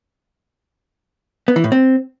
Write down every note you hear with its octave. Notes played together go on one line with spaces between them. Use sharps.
B3
E3
A2
C4